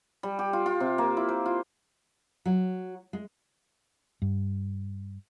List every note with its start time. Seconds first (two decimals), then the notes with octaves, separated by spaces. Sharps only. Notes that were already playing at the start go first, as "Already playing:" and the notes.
0.23 G3
0.39 G4
0.53 F4
0.66 F4
0.80 C3
0.98 A#3
1.17 E4
1.29 C5
1.46 F4
2.45 F#3
3.13 G#3
4.22 G2